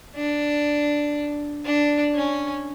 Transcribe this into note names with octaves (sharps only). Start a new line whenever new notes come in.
D4
D4
C#4